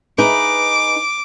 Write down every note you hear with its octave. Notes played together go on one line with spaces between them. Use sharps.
D#4 G#4 B4 D6